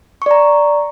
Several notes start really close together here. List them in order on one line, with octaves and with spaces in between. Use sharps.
C#6 D5 A#5